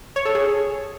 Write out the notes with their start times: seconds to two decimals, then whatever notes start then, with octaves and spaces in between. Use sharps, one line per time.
0.16 C#5
0.25 A4
0.35 G#4